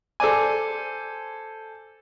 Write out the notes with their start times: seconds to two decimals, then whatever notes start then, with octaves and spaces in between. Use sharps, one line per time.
0.20 A4 C5 D5 G#5